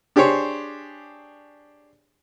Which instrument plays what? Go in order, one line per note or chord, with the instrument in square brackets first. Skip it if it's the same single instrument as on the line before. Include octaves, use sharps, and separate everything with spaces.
[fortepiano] D4 G4 G#4 C5 C#5